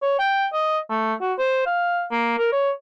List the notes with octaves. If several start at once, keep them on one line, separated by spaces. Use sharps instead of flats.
C#5
G5
D#5
A3
F#4
C5
F5
A#3
A#4
C#5